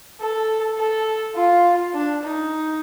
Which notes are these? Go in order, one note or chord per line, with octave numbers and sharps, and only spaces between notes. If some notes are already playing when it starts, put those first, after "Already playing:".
A4
A4
F4
D4
D#4